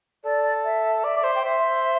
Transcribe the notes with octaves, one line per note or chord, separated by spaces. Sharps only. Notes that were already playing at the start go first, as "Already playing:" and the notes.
A4 D5
E5
D5 E5
D5
C5
G5
C5 E5